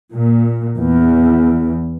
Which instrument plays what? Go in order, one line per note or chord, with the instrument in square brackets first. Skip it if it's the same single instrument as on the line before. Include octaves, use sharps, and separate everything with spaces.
[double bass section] A#2
E2